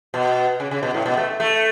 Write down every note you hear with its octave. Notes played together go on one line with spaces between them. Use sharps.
B2
C#3
C#3
B2
A2
B2
A3
A3